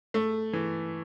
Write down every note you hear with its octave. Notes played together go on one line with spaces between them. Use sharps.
A3
E3